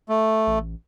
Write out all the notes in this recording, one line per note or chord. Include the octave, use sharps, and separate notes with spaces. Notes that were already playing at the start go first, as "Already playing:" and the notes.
A3
A1